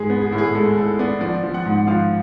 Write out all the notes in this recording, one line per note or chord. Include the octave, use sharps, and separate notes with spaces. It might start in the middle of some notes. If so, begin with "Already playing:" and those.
Already playing: G#2 G#3 G#4
B3
G#4
A2
G#4
G#3 A4
A2 A4
B3 D5
F3 D5
F3
F#5
G#2
F3 F5